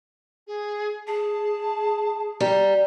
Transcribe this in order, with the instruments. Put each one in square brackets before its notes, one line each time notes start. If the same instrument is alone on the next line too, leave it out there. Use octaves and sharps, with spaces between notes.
[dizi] G#4
[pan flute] G#4 [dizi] A5
[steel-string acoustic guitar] G3 [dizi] A#5